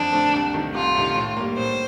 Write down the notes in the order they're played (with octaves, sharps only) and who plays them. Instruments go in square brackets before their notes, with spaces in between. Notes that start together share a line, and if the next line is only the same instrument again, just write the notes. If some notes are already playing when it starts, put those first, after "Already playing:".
Already playing: [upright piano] F2 D3 A3 C4 [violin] D4
[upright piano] D3 A3 C4
C2
C3 D#3 A3
[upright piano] C2 [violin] F4
[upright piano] C3 D#3 A3
A2
G3 A#3
[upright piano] A2 [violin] C5